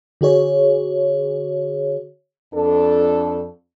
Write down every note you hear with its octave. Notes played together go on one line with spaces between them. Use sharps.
D3 F#4 G#4 C#5
F2 D4 A4